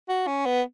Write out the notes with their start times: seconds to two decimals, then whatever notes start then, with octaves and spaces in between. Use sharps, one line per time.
0.09 F#4
0.27 C#4
0.45 B3